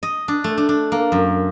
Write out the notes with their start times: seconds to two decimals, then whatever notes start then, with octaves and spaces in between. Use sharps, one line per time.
0.03 D#5
0.28 D4
0.44 A3
0.58 D4
0.69 D4
0.92 A#3
1.12 F#2